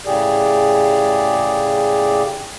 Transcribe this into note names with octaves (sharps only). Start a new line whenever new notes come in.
A2 C#3 G4 G#4 D5